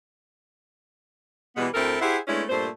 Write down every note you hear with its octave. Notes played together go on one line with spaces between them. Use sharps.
B2 E3 G3 G#3 B3
D2 C4 E4 A4 A#4
E4 G4 G#4 C5 E5 F#5
G#3 A3 B3 C#4 D4 E4
G2 A#2 A3 C5